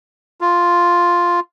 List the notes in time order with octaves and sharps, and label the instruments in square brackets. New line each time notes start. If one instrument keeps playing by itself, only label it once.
[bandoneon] F4